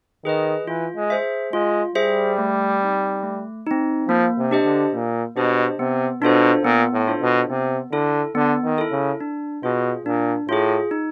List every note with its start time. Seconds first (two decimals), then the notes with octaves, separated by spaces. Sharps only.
0.25 D#3 G#4 B4 D#5
0.67 E3 F4
0.96 G#3
1.10 G#4 C5 E5
1.53 G#3 F4
1.95 G3 G#4 C5 E5
2.38 A3
2.81 C4 D#4
3.23 A3
3.66 C4 D#4
4.08 F3 A#3
4.38 C3
4.51 D4 G4 C5 D#5
4.65 D3
4.94 A#2 A#3
5.36 B2 D4 G4 C5 D#5
5.79 C3 B3
6.22 B2 D4 F4 A4 C5
6.64 A#2 B3
6.93 A2
7.07 D4 F4 A4 C5
7.22 B2
7.49 C3 B3
7.92 D3 E4 A4
8.35 D3 B3
8.63 D#3
8.78 E4 A4
8.91 C#3
9.20 D4
9.63 B2 F4 G#4
10.05 A#2 D4
10.49 A2 F4 G#4
10.91 D#4